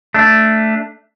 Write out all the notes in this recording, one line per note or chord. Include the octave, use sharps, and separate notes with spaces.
A3 D4